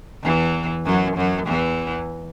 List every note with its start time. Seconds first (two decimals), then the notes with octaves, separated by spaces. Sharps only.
0.23 E2 E3
0.85 F#2 F#3
1.17 F#2 F#3
1.47 E2 E3